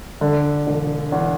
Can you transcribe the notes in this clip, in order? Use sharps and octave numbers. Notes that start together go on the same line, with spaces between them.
D3
E1
E2